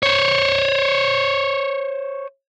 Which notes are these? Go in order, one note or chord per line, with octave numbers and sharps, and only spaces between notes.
C5 C#5